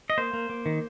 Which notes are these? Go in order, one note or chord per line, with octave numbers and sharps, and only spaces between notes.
D#5
A#3 C5
A#3
A#3
D#3